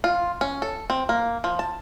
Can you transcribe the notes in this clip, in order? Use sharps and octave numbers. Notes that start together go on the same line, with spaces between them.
F4
C#4
A4
C4
A#3
F3
A5